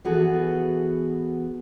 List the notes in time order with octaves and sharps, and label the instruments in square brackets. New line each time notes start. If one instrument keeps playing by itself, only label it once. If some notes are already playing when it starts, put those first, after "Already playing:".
[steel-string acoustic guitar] E3 B3 F#4 G#4 A4